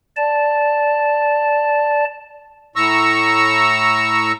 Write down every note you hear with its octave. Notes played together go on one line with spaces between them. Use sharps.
D5 A5
A2 A#5 C#6 E6